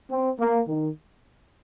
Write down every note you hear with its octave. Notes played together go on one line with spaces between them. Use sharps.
C4
A#3
D#3